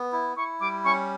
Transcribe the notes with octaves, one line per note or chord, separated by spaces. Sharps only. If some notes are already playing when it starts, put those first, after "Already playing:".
Already playing: B3
E4
E4 C#6
G3 D6
C#4 C#6